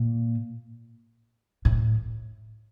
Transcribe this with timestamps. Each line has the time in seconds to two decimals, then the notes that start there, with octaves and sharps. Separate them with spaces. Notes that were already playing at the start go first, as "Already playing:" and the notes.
Already playing: A#2
1.65 A2